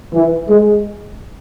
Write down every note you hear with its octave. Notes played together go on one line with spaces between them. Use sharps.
E3
G#3